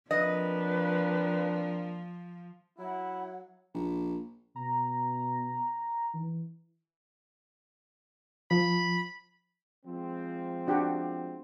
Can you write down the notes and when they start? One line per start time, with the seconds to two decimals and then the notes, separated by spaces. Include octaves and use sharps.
0.11 F3 A#3 C4 D4 B4 D#5
2.78 F#3 E4 F#5
3.74 A#1
4.56 B2 A#5
6.14 E3
8.51 F3 B5
9.86 F3 G#3 C4
10.67 D4 F#4 G4